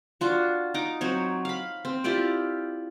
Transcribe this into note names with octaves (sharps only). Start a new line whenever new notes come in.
D4 F4 F#4
D#4 A#5 D6
F#3 C4 C#5
F5 B5
C4
E4 F4 G4 D5